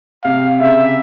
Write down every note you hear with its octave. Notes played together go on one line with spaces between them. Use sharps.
C3 F5
C#3 E5